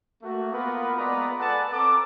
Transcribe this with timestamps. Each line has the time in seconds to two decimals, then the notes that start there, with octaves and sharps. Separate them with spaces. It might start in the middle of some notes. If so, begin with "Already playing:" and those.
0.23 A3 A#3 F#4
0.52 A#3 B3 F4 A#4 B4
0.97 G#3 B3 F4 B4 D5 A#5
1.39 A4 B4 D5 F#5 G#5 A5
1.72 C4 A4 A#5 D6